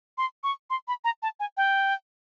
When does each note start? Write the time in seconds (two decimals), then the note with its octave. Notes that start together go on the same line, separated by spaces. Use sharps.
0.18 C6
0.44 C#6
0.70 C6
0.88 B5
1.04 A#5
1.23 A5
1.40 G#5
1.57 G5